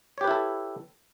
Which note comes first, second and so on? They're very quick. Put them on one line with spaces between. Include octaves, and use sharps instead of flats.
C#5 G4 B4 E4 A4